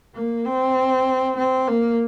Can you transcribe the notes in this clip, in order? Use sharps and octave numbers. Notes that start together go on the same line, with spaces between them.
A#3
C4
C4
A#3